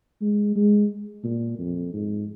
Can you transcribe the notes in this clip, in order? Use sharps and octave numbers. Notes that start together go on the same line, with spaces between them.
G#3
G#3
A#2
F2
G#2